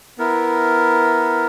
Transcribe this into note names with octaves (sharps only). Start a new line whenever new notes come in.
B3 E4 A#4